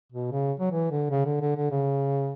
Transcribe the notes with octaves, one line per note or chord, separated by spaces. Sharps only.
B2
C#3
F#3
E3
D3
C#3
D3
D3
D3
C#3